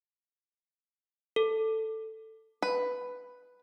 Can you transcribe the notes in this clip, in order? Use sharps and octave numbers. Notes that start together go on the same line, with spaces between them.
A4
B4